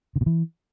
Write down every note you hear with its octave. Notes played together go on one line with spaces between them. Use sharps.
D3
B2
E3